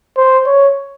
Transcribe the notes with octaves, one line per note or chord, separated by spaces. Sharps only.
C5
C#5